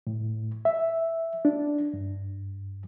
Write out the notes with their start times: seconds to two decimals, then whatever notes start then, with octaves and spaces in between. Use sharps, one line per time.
0.07 A2
0.65 E5
1.45 D4
1.94 G2